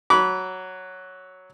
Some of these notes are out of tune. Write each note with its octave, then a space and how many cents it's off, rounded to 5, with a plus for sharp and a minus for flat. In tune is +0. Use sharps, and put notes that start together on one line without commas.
F#3 +0 B5 -15 D6 -40